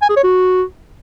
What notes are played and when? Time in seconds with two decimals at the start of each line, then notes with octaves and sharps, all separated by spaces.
0.02 G#5
0.09 G#4
0.16 C#5
0.24 F#4